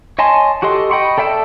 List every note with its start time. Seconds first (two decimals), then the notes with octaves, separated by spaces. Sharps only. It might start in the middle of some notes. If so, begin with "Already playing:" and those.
0.19 C#5 D#5 G#5 A5 C6
0.62 F#4 G4 A4 D#5 C6
0.91 D#5 G5 B5 C#6
1.18 A4 D5 E5 G5 A5